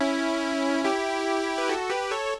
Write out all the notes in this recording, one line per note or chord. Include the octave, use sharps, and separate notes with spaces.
C#4 E4
E4 G4
B4
F#4 A4
G4 B4
A4 C#5